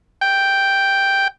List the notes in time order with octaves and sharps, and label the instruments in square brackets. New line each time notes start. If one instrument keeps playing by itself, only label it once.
[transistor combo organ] G5